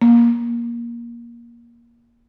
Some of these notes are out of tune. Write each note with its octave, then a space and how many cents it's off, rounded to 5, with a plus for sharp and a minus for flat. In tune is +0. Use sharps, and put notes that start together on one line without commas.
A#3 +20